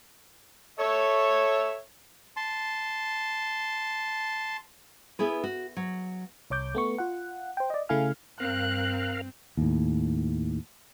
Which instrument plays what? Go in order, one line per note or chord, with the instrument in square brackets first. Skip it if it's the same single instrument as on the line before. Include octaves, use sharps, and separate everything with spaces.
[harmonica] A4 E5 [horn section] C#5
[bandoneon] A5 C6
[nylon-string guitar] B3 E4 G#4 B4
F#4
F#3
[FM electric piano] C2 C#5 D6 G6
A3 B3 C#6
F4 F#5
C5 G5
D5 D#5
C#3 A3 E4 F5 G#5 F6
[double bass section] G2 [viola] C4 [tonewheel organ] A#4 F5 [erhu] F#6
[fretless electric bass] D#2 A2